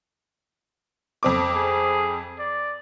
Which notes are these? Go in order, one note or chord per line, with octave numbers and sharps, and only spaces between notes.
F2 C4 D6
G#4
D5